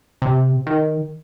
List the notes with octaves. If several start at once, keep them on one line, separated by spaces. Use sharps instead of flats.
C3
D#3